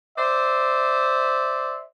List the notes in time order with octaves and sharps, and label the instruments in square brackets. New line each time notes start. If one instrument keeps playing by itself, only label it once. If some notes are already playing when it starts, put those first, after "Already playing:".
[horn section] C5 D5 E5